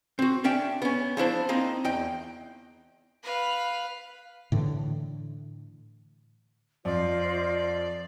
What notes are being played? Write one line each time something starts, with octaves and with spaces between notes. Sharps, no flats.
C4 F#4
C#4 D4 E5 G5
B3 C#4
F3 D4 E4 C5
A#3 C4 D#4
E2 D#5 G5
B4 F5
A2 D3 E3
F2 F4 C5 D5 D#5